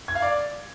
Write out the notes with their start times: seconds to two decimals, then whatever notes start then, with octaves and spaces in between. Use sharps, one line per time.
0.08 G#6
0.15 F5
0.22 D5